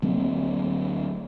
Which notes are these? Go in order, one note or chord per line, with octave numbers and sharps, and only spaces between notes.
D2 F#3 A#3 C4